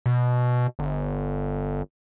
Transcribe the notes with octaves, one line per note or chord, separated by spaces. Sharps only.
B2
G1